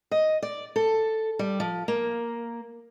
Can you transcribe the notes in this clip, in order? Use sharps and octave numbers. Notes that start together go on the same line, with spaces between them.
D#5
D5
A4
G3
F3
A#3